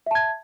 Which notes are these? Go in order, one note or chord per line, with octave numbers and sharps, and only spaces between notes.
E5 A5 G#6